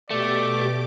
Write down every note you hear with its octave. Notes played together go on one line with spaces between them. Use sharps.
B2 A3 G4 D5 D6